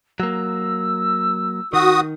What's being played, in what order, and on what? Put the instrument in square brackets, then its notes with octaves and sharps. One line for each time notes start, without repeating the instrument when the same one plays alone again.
[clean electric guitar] F#3 A#3 [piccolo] E6
[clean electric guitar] D#3 [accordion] F#4 D#6